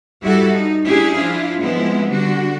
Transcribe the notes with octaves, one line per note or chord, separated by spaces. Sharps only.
G3 E4 F#4 A4
D#4
C#4 D4 E4 G4 G#4
F3 D4 E4 F4
F3 G#3 B3 C4 E4
D3 G3 D4 F#4